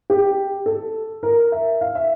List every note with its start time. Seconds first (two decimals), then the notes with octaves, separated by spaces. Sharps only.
0.10 G4
0.66 A4
1.23 A#4
1.52 E5
1.81 F5
1.95 E5